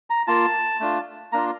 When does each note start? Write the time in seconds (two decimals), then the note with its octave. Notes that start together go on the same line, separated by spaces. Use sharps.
0.10 A#5
0.27 A#3 F4 A5
0.80 A3 D4 F4
1.33 A#3 D4 F4 A#5